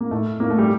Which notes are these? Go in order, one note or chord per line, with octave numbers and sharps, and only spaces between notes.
A#3
A2 A3
A2 A#3
A3
G3